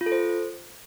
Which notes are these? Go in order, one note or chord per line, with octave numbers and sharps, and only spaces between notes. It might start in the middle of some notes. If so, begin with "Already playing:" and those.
F4
A4
C5